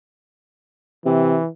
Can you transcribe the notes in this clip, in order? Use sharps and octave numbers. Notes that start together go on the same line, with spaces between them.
C3 E3